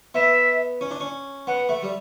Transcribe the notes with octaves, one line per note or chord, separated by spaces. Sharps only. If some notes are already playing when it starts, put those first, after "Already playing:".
B3 E5
C#4
D4
C#4
B3 F#5
A3
G3